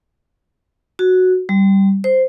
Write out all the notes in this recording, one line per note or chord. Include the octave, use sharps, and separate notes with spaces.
F#4
G3
C5